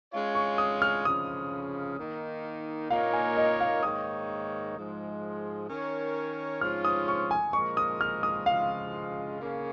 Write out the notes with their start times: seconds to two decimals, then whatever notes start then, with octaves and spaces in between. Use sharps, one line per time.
0.13 G#3 C#4 F4 C#5
0.35 C#6
0.58 D#6
0.82 F6
1.05 C#3 F3 C#4 D#6
1.97 D#3 A#3 D#4
2.90 A#2 A#3 D#4 A#4 C#5 F5
3.13 G#5
3.36 D#5
3.60 F5
3.83 G#2 D#3 A#3 D#4 C#5 D#6
4.76 G#2 F3 G#3
5.69 D#3 C#4 A#4 C#5
6.61 G#2 F3 C#4 F4 F6
6.85 D#6
7.08 C#6
7.31 G#5
7.53 A#2 F3 G#3 F4 A#4 C#6
7.77 D#6
8.01 F6
8.23 D#6
8.46 C#3 F3 G#3 F4 F5
9.39 C#3 A#3 C#4